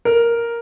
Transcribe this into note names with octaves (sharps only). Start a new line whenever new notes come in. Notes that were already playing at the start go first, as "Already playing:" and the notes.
A#4